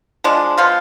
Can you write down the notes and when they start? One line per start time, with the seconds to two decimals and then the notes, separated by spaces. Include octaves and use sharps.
0.24 F3 G#3 D4
0.58 F3 B3 F4